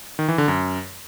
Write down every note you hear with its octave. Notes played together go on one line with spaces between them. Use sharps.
D#3
E3
D3
F#2